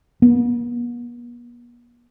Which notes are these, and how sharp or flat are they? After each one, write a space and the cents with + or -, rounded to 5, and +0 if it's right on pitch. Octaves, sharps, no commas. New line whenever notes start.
B3 -45